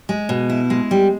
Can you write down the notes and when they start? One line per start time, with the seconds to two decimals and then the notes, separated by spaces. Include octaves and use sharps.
0.09 G#3
0.29 B2
0.50 E4
0.70 G#3
0.91 G3